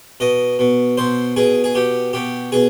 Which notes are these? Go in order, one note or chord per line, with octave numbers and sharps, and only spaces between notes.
B2 D#5
B2
B2 C5
B2 G#4
G#4
B2 G4
B2 G4
B2 G#4